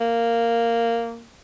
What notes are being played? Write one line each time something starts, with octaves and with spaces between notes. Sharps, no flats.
A#3